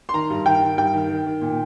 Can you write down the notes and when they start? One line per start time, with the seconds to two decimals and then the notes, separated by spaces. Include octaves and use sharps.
0.09 C6
0.14 D#3 A#5
0.30 G2
0.46 D#3 G5
0.62 D#3
0.77 G2 G5
0.94 D#3
1.10 D#3
1.26 D#3
1.41 A#2